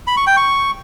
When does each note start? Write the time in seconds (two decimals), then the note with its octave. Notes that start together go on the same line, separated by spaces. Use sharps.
0.07 B5
0.17 C#6
0.27 G5
0.37 C#6